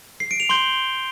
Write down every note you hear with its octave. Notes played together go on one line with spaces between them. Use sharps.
C7
D7
F7
C6 G6 G7